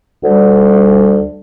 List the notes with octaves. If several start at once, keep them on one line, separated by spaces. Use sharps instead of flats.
D2 D3 G3